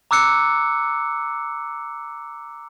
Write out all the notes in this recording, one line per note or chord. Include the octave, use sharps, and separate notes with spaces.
A#5 D6 E6 F#6 C#7